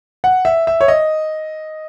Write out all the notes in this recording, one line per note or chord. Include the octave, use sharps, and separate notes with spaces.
F#5
E5
E5
C#5
D#5